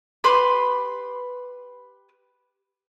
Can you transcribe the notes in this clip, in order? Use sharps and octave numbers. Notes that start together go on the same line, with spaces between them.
G4 B4 B5 C6